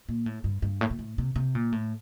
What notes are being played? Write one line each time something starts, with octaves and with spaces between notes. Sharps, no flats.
A#2
A2
G2
G2
A2
A#2
A2
C3
C3
A#2
A2